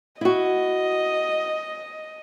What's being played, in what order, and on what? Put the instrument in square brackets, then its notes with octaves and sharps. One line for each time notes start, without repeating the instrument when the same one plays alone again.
[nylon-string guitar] E4 F#4 [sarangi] D#5